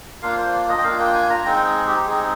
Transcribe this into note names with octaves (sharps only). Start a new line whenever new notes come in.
A#3 D4 F4 F5
C5
D5
D#5
G5
A#3 D4 F4 F5
G5
G#5
A#5
G#3 C4 D#4 G5
G#4
G4
G#3 C4 D#4 G#4